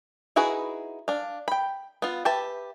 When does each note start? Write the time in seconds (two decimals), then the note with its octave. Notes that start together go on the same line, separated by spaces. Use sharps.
0.36 D#4 E4 F#4 G#4 B4
1.08 D4 F5
1.48 G5 B5
2.02 B3 F4
2.25 G4 B4 E5 A5